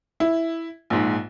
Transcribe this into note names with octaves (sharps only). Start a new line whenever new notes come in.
E4
A#1 G#2